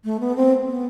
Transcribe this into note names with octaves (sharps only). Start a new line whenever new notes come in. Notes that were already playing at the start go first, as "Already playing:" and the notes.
A3
B3
C4
B3